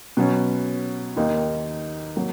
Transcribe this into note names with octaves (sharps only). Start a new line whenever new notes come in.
B2 F#3 C#4
D#2 D#3 A#3 D#4
F#3 A#3